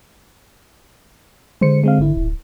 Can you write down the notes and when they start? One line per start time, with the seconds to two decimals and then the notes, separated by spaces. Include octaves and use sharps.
1.61 D3 G#3 C5 C#7
1.84 G#3 C4 F5
1.99 G#1 E4
2.16 D1